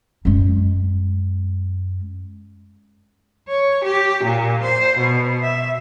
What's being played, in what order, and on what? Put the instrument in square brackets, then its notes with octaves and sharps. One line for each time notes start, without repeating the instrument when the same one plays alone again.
[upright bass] F#2 G#3
[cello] C#5
G4
A#2
C5
B2
E5